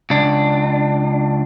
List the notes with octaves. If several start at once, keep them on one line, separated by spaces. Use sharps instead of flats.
C#2 D4